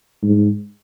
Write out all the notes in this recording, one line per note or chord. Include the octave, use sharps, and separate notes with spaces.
G#2